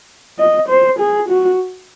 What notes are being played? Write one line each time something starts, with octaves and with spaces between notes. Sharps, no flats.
D#5
C5
G#4
F#4